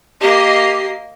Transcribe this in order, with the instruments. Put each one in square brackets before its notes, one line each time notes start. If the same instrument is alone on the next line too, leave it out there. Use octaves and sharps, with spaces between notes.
[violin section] A#3 D#5 C7 [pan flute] G4